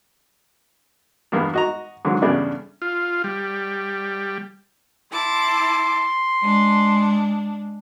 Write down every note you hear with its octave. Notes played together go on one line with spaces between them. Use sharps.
E2 G2 A#3 B3
F#4 D#5 A#5
G#2 D3 D#3 F#3
E2 G2 C#3 A3 B3 D4
F4
G3
E4 A5 C6 D6
G#3 D4